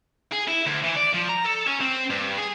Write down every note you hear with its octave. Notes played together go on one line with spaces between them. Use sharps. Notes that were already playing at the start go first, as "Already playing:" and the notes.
G#4
E4
D2
E3
D5
F3
A#5
A4
C#4
C4
G2
G#4